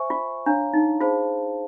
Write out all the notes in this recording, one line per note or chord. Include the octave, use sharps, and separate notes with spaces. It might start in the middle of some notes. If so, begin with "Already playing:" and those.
Already playing: C5 E5 G#5 C#6
F4
D4 C#5 F5 A#5
D#4
F4 G#4 C5 F5 A5